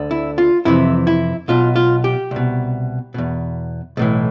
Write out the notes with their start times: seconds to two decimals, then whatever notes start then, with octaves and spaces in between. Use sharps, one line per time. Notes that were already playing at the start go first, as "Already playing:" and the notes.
Already playing: D2 D3
0.11 E4
0.38 F4
0.65 F2 C3 E3 E4
1.07 E4
1.48 B1 B2 F4
1.76 F4
2.04 G4
2.31 C2 B2
3.14 E2 B2
3.97 B1 A2 E3